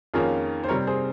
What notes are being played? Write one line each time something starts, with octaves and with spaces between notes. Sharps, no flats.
F2 D#3 A#3 C#4 F4 G#4
C5
C3 G3 C4 A#4 C#5
G#4 C5